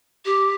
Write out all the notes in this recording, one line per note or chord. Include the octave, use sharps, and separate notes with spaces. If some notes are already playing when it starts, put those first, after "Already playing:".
G4